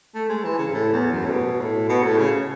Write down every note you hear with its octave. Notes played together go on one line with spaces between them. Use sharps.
A3
G#3
E3
C#3
G#2
A2
E2
F#2
A2
B2
A2
B2
A2
C#3